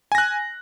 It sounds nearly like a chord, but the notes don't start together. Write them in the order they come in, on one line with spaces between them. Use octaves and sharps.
G#5 A#6 F#6